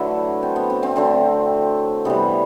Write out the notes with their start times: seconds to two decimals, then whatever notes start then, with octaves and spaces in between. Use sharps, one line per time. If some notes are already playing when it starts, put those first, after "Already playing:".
Already playing: D3 F#3 A3 E4 F#4 A4 B4 E5
0.43 C4
0.56 B3
0.70 C4
0.83 C4
0.96 D3 F#3 A3 C4
2.05 C3 E3 G3 B3